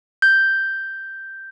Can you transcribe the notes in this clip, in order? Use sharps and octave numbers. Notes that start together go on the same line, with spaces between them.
G6